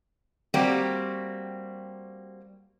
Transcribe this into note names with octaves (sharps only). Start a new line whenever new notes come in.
G3 A#3 C4 F#4 G4